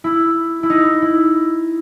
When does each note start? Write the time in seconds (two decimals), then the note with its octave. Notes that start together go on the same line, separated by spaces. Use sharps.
0.04 E4
0.63 E4
0.70 D#4
1.02 E4